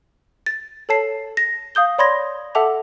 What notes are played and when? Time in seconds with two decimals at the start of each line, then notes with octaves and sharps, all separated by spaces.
0.46 A6
0.89 A4 C#5 A5 C7
1.37 A#6
1.75 F5 D#6 G6 G7
1.98 C#5 D5 B5 C6 G#6 A#6
2.55 A4 E5 F#5 A5 D6 F7